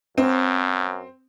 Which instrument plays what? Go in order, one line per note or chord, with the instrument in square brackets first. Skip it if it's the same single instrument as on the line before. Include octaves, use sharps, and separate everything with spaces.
[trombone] F#2 [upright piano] C4